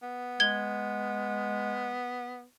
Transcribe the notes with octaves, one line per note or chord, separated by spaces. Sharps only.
B3
G#3 G#6 G7